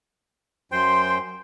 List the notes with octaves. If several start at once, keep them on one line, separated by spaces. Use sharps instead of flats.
F#2 C5 G5 C6